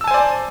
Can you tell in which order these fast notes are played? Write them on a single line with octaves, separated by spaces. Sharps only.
E6 A5 G#5 C5 D5